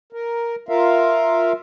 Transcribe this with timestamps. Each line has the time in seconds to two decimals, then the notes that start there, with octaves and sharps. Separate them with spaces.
0.13 A#4
0.69 F4 A#4 E5 F5